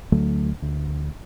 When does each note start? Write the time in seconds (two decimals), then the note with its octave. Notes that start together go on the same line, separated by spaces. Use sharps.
0.12 D2 D3 F#3 A3
0.62 D2